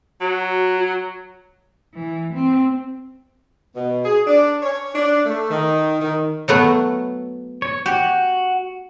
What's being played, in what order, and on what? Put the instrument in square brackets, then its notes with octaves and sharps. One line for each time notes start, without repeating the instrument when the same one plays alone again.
[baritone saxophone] F#3 [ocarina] F#4
[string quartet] E3
C4
[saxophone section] B2
G#4
D4
C#5
D4
A3
D#3
D#3
[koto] F#3 A3 B3
[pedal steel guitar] C#5
[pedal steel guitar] F#4 [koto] G4